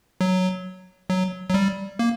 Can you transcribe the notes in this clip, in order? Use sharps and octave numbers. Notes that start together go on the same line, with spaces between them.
F#3
F#3
F#3
G3
A#3